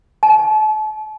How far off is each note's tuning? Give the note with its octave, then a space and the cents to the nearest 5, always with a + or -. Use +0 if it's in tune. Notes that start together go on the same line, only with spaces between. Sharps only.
A5 -40